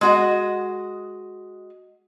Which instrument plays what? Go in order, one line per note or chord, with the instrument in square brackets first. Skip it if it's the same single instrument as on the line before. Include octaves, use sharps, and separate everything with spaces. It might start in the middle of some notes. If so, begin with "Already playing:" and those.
[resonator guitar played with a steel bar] G#3 F#4 D#5